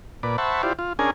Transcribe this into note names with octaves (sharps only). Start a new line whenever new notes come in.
A#2 B4 D5
C5 E5 F#5 A5 B5 C#6
E4 F4 G4 C5 D5
F4
C#4 D4 G#4 A#4 G#5